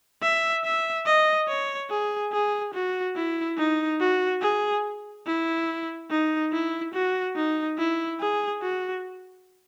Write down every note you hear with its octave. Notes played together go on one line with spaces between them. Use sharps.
E5
E5
D#5
C#5
G#4
G#4
F#4
E4
D#4
F#4
G#4
E4
D#4
E4
F#4
D#4
E4
G#4
F#4